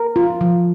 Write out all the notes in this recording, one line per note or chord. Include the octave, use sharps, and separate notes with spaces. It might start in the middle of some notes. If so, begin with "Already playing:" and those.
Already playing: A#4
F4
F3